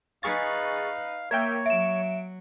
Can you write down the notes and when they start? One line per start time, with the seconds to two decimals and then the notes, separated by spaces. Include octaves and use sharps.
0.23 D#4 G#4 B4 F5 C#6 A6
1.31 A#3 A#4 C#5 E5 G5 G#6
1.66 F#3 E5 D7 E7